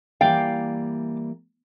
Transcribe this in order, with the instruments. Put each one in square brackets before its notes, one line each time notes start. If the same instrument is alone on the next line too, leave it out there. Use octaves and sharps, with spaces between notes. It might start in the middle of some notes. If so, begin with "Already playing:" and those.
[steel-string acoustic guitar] E3 G3 A#3 [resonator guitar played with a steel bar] D5 F5 G5